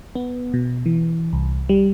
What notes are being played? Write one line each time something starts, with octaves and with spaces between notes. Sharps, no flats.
B3
B2
E3
C2
G3